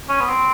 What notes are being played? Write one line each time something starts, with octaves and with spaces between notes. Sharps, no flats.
C#4
B3
C4